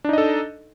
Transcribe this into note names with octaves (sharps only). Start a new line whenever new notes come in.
D4 D#4 A4 D#5